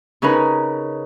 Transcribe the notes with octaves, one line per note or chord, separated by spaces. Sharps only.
C#3 C#4 D#4 A#4 B4